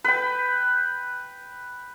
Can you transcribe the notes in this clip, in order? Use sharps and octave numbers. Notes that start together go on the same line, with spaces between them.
B4 G5